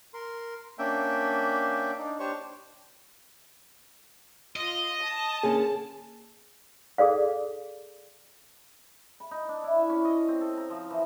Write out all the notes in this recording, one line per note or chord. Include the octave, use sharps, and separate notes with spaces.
A#4 C6
A#3 C#4 D4 E5 G5
D4 D#4
D4 G4 C5 C#5 C#6
F4 D#5
A5
D3 A#3 C#4 G#4
G#4 A4 D5 F5
B5
D#4
D4
E4
E5
C#4
D#5
C4
A4
A#5
F3
E3